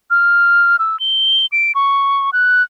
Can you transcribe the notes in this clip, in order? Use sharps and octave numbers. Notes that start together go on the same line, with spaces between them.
F6
E6
G7
D7
C#6
F#6